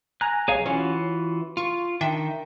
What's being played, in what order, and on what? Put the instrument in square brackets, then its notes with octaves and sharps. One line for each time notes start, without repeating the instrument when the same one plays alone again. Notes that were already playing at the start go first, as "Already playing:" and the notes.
[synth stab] G#5 A#5 [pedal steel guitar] F#6
[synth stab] B1 [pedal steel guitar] G#4 C#5 F5
[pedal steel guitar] E3 F4 F#4 [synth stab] C#4
[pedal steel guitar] F4 [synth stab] F5 C#6
[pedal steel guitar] D#3 [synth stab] D4 E5 G5